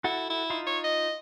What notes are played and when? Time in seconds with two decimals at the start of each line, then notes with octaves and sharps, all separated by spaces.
0.04 E4 F#4 A4 F#5
0.30 E4
0.50 D#4 F4 C6
0.66 C#5
0.84 D#5